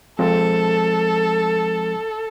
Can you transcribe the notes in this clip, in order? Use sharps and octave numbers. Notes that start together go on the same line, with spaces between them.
F3 G#3 C4 A4